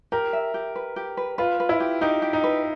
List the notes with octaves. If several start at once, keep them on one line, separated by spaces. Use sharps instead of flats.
G4 A#4
E5
G4
B4
G4
B4
F4 B4
B4
E4
G4
D#4 G4
G4
D#4
B4